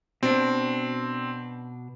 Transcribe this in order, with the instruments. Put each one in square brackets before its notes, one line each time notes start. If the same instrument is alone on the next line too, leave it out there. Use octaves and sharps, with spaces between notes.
[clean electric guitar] B2 D4 [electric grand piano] C4